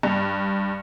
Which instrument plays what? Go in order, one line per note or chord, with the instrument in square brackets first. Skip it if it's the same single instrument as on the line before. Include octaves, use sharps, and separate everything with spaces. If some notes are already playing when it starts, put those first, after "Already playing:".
[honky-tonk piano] G2